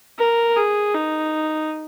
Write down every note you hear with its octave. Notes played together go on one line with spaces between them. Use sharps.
A#4
G#4
D#4